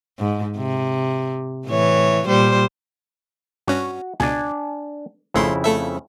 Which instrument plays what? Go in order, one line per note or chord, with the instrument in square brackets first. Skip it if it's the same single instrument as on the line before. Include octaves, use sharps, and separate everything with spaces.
[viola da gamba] G#2
C3
A2 E3 C#5
A#2 G3 C5
[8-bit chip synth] G2 C#4 [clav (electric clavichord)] F#4
[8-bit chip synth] C#2 B2 [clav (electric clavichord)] D4 G#5
[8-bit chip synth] G#1 A3 C6 [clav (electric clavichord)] F2 C#3 E4
[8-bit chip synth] A3 A4 E5